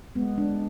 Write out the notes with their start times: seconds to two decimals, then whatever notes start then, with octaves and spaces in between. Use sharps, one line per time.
0.15 G#3 B3
0.38 G#3 D4